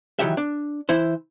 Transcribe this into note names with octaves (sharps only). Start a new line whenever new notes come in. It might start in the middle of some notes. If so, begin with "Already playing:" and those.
D#3 E3 F#3 G4 E5
D4
E3 E4 C5